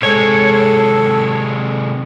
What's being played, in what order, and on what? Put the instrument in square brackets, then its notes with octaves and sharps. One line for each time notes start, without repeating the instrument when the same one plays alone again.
[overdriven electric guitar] C3 G#3 [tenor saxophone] A4 [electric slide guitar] C#5